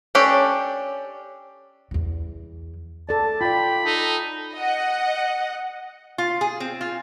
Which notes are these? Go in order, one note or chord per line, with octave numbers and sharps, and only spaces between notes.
C#4 D4 G4 A4
E2 E3
A4 D5 A5
F4 D5 G5 B5
D#4 A4
D#5 F#5
F4
G#4
C4
F4